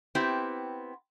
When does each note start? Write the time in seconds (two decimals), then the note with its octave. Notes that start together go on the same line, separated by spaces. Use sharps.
0.15 B3 C4 E4 G4